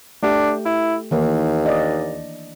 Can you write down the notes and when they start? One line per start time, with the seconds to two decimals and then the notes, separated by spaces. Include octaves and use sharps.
0.23 A3 D4 G4
0.65 E4
1.11 D#2 D#3 E3 A#3
1.65 D4 D5 D#5